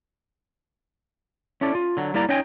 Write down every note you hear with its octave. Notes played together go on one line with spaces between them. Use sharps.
C#4 E4 A4 D5
F4
D3 F#3
G3 A#3 E4 D5 A#5
C#4 D#4 C#5 D#5 G5 G#5